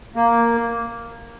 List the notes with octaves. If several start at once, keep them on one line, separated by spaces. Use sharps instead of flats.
A#3